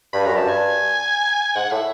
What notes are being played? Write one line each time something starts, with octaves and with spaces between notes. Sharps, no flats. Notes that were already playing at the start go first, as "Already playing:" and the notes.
G2 B5
F#2 A#5
G2 A5
G#5
G#2 F#5
A2 E5